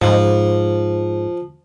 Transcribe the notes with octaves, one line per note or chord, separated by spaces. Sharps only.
G#2 F3